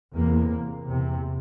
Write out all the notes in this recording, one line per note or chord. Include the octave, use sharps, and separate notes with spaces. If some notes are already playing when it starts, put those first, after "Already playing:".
E2 C3 A#3
E2 C3